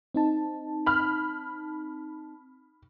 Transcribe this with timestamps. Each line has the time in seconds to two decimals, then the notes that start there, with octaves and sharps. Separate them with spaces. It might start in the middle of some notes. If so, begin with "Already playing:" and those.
0.14 C4 D#4 A5
0.86 B5 F6